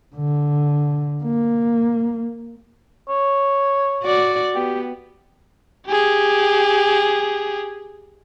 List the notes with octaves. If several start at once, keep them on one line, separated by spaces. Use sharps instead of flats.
D3
A#3
C#5
F#4 D5
B3 G4
G4 G#4